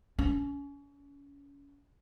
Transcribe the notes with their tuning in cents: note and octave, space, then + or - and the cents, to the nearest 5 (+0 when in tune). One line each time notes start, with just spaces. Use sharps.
C#4 +30